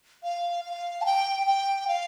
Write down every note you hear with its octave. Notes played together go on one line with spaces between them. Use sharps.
F5
F5
A5
G5
G5
F5